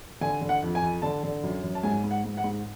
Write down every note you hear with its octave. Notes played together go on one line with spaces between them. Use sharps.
D3 G#5
D3
F#5
F2
G#5
F2
D3 A5
D3
F#2
F#2
A5
G#2 G#5
G#2
F#5
G#2
F#5
G#2